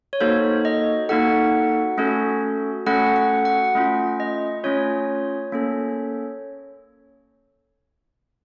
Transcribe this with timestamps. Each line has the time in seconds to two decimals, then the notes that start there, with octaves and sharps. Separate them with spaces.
0.13 C#5
0.21 A#3 D#4 F#4 A4 C5
0.65 D#5
1.09 A#3 D#4 F#4 A4 F#5
1.98 A3 C#4 F#4 A4
2.86 A3 C#4 F#4 A4 F#5
3.16 F#5
3.45 F#5
3.75 A3 C#4 F4
4.20 D#5
4.64 A3 C#4 F4 C#5
5.52 A#3 C#4 A4